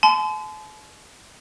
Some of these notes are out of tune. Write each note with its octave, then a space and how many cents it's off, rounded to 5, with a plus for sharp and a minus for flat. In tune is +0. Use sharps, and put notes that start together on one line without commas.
A5 -45 C6 -35